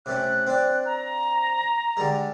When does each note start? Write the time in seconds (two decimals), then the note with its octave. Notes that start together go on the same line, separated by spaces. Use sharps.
0.06 C3 A3 C#4 F#6
0.47 C4 D4
0.86 A#5
1.97 D3 G3 G#3